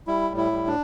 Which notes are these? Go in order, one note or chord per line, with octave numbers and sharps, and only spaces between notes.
G3 E4
A2
E4
G3
D4